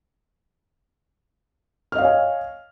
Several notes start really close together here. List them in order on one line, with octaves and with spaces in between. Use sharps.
F6 D#5 F5 C#5 G#5